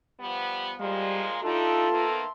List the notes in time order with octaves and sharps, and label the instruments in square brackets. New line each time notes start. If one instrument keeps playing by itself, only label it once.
[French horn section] F3 G3 B3
[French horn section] A#2 F3 G#3 [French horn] G3 [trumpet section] F5 A#5 C6
[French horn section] G3 D4 D#4 [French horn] F4 [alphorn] A4 [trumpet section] E5 A5 C6
[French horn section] D#3 A#3 B3